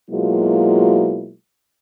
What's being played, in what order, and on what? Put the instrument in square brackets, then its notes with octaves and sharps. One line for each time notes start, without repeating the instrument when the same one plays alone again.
[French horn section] B2 F#3 G#3 A#3 E4 F4